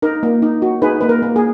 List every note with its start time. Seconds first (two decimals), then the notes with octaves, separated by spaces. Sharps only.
0.02 D#4 A#4
0.23 A#3
0.42 D#4
0.62 F#4
0.82 D#4 G#4 B4
1.01 A#3 B4
1.09 A#4
1.22 A#3
1.36 G#4